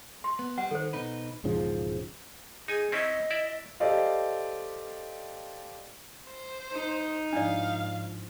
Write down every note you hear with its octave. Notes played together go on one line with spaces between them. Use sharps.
C6
B3
G3 F#5
D#3 A4 C5
B2 D#4 B4
E1 G#2 C#3 F3
D#4 G#4 G#5
C4 C#4 E4 D#5
E4 D5 E5
G4 A4 C5 D5 D#5 F5
C5
D#4
G#2 F3 D4 E4 D5 F5